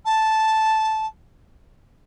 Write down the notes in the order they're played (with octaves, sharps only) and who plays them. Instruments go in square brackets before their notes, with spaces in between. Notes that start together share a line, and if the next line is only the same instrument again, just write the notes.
[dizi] A5